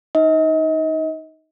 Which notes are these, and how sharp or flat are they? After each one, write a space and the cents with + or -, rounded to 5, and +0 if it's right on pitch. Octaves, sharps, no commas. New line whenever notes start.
D#4 +0 D#5 +35